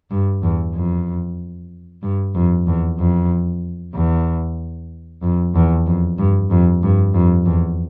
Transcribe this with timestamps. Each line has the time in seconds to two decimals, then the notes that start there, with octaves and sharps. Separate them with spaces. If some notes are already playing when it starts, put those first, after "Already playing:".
0.11 G2
0.43 E2
0.75 F2
2.03 G2
2.35 F2
2.66 E2
2.99 F2
3.94 E2
5.22 F2
5.55 E2
5.86 F2
6.18 G2
6.51 F2
6.83 G2
7.14 F2
7.46 E2